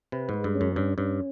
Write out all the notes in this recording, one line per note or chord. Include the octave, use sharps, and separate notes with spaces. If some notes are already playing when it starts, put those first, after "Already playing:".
C3 B4
G#2 G#3
G2
C#4
F#2
G2 C#4
G2 C#4